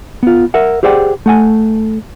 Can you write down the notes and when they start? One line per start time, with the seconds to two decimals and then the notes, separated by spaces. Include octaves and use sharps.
0.23 B3 F4
0.54 A#4 E5 F#5
0.83 G4 G#4 C5 D5 F#5 G5
1.26 A3 F#5 G#5